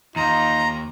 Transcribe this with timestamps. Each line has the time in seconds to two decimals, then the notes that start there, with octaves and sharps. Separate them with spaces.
0.16 D#2 D#4 F4 A#5